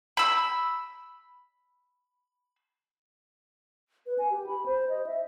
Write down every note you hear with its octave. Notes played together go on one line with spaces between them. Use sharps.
B5 E6
B4
G#5
G4
B5
C5
D#5
E5